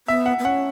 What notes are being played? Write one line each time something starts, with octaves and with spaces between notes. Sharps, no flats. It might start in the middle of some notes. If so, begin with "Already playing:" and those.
B3 E5
F#5
B3
C#4 F#5